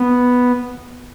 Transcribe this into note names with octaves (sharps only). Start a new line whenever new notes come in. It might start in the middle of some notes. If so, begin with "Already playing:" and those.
Already playing: B3